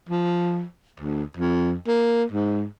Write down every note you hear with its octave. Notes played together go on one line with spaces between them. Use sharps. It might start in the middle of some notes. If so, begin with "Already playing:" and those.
F3
D2
F2
A#3
G#2